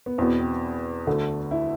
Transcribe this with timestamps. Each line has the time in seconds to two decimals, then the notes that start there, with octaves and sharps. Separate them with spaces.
0.06 B3
0.18 E2 B2 B3 C4
0.40 C4
1.07 D2 D3 A3
1.51 E4